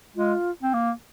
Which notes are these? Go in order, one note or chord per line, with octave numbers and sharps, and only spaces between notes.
G#3 F4
C4
A#3